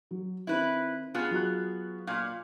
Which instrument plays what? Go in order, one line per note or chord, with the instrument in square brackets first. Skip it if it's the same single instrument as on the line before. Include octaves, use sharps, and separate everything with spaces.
[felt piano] F#3
[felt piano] D#3 C4 [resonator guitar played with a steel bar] E4 B4
[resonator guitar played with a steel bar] B3 F4 G#4
[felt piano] F#3 F#4 F#6
[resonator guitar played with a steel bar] A#2 F5